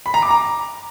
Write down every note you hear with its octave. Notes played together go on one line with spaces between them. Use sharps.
B5
A#5
D6
A#5